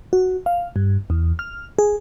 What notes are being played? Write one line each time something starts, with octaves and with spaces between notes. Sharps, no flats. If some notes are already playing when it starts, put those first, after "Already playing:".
F#4
F5
G2
E2
F6
G#4